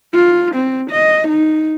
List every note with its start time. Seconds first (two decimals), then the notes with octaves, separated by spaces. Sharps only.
0.14 F4
0.55 C4
0.91 D#5
1.28 D#4